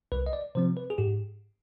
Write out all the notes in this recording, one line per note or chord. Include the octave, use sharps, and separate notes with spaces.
C2 B4
D#5
D5
C3 F3 C4 C5
B4
G#4
G#2 G4